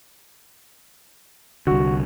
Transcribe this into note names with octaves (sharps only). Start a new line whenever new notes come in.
C2 D3 F#4